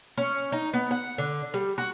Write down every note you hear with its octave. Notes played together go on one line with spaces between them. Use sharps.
C#4
D#4
B3
F#5
D3
G3
F#4